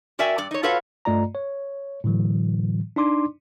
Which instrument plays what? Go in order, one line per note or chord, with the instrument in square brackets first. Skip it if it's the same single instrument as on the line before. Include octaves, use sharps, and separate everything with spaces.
[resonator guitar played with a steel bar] F#4 A#4 D5 E5 G5 G#5
G2 D5
D#4 C#5
F4 F#4 A4 B4 C#5 F5
[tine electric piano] G2 A3 F4 D5 D#5 A#5
C#5
A2 D3 E3 F#3
D4 D#4 D5 C6 D6